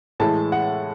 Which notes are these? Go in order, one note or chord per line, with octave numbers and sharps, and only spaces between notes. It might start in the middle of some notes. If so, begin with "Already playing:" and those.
A2 E3 G#3 A5
F#5